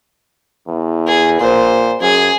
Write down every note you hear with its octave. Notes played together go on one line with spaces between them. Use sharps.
E2
G#4
A#2 C5
F#2 G#4